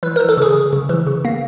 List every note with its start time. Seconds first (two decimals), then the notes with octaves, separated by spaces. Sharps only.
0.03 E3 B4
0.16 A#4
0.20 E3
0.29 A4
0.37 C#3 G#4
0.55 C#3
0.73 C#3
0.89 E3
1.07 C#3
1.25 A#3